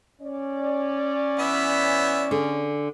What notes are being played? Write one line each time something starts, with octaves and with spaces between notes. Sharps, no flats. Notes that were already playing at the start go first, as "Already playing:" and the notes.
C#4 D5
E3 B3 E5
D3 G#4